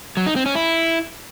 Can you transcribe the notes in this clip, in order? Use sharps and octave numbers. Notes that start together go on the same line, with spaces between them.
F#3
D#4
C4
C#4
E4